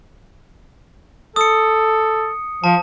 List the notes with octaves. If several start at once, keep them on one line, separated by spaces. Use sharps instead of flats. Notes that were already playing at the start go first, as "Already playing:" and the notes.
A4 D#6 C#7
F3 A5